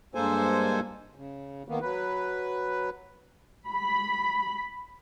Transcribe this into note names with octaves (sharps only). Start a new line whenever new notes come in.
G2 G#3 A#3 A4 C5 G#5
C#3
D#3 A#3 B3
F#3 B4
B5